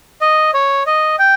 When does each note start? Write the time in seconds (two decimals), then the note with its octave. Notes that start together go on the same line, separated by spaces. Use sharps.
0.21 D#5
0.54 C#5
0.86 D#5
1.19 G5